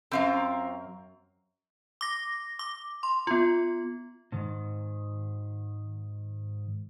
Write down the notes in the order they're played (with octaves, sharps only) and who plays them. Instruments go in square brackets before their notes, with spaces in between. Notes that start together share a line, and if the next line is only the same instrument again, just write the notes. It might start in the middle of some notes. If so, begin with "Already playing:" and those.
[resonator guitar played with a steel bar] F#2 [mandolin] C4 F4 A#4
[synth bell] D6 A#6
D6
C6
B3 F4
[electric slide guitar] G#2 D#3